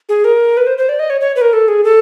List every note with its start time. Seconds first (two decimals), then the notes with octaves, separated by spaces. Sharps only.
0.09 G#4
0.25 A#4
0.57 B4
0.67 C5
0.78 C5
0.89 D5
0.99 D#5
1.10 C#5
1.21 C#5
1.36 B4
1.41 A#4
1.53 A4
1.68 G#4
1.84 A4